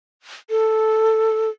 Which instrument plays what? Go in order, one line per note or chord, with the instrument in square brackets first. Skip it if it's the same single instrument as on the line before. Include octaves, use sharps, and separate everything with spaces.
[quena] A4